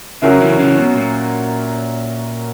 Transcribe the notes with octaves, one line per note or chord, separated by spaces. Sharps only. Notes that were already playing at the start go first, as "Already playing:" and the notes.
C#3 F#3 C#4 F#4 A#4 E5
C#3 E3
C#3 E3
B2
A#2